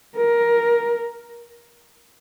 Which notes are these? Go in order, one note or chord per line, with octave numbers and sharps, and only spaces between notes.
A#4